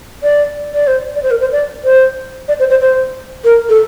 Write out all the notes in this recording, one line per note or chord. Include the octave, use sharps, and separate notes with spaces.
D5
D5
C5
D5
C5
A#4
C5
D5
C5
D5
C5
C5
C5
A#4
A4